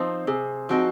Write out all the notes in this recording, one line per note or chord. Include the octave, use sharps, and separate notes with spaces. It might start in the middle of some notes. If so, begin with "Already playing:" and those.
Already playing: F3 C4 D#4 C5
C3 G#4
F3 C4 D#4 F#4